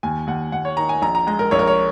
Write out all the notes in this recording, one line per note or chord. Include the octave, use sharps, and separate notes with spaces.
D#2 G#5
D#2 F#5
D#2 F#5
C#5
D#3 A#5
G#5
A#1 A#5
A#5
G#3 A#5
A#4
A#1 C#5
A#4
C#5